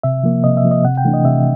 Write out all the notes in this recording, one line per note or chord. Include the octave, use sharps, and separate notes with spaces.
C3 E5
F3 A#3
C3 D#5
E5
F3 A#3
D#5
C3 F#5
G5
E3 A3 D4
D#5
C3 E5